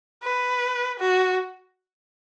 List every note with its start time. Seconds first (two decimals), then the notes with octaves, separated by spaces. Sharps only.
0.24 B4
0.99 F#4